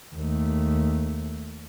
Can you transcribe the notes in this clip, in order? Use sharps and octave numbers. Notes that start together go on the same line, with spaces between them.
D#2 A3